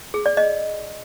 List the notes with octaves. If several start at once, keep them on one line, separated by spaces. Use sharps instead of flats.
G#4
D5
D#5